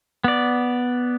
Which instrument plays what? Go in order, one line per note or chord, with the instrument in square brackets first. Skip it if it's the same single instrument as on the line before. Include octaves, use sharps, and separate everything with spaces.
[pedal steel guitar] B3 D5